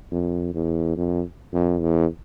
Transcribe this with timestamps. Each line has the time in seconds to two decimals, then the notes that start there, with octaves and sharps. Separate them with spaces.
0.11 F2
0.54 E2
0.96 F2
1.53 F2
1.81 E2